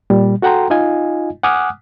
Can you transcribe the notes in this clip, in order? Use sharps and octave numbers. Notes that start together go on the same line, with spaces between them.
A#2 G3
F#4 A4 F#5 G5 A#5 C6
D#4 F4 D#5 F5 G#5
F#5 G#5 D6 D#6 F6 F#6